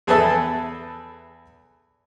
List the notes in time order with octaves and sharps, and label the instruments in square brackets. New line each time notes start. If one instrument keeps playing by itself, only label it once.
[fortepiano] E2 G#4 A4 B4 E5 A5